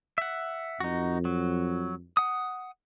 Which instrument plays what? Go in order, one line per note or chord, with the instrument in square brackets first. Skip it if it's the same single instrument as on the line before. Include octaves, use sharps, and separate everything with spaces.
[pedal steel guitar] E5 F#5
[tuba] F2 [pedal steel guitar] D#4 F#4
[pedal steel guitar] F#3
F#5 D#6